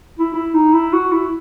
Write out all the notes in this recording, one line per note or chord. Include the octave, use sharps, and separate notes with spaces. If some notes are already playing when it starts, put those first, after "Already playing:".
E4
E4
D#4
E4
F#4
E4